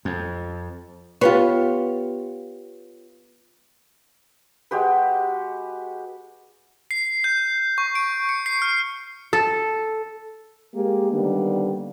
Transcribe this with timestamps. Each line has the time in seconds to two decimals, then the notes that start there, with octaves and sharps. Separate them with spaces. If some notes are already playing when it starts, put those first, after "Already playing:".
0.05 F2
1.21 B3 F4 G4 C#5
4.71 G#3 F#4 G4 B4
6.91 C7
7.24 G6
7.78 C#6
7.95 D7
8.29 C#7
8.46 C7
8.62 F6
9.33 A4
10.74 G#3 A#3 G4
11.12 D3 D#3 G3 A#3 B3 D4